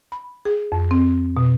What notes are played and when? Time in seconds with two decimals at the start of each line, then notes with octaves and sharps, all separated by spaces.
0.12 B5
0.45 G#4
0.72 F2
0.91 C4
1.37 B2